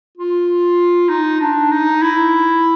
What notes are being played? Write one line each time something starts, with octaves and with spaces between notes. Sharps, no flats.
F4
D#4
D4
D#4
E4